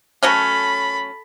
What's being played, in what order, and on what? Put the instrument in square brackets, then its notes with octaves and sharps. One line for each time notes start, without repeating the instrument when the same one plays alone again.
[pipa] F#3 A3 C#4 [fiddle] A4 B5